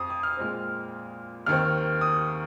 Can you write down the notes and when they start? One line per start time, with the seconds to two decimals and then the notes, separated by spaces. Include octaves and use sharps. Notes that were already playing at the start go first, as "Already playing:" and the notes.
Already playing: F2 C4 D#6
0.10 D#6
0.23 F6
0.37 A#2 G#3 C4
1.46 D#2 D#3 C4 F6
2.01 D#6